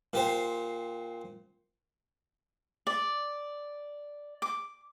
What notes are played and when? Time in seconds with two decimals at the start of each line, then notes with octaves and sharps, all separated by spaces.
0.13 A#2 G4 C5
2.87 D5
4.42 D6